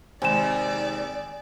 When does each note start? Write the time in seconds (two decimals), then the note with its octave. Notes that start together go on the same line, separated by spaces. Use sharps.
0.22 D#2 C3 G#3 D5 G#5 E7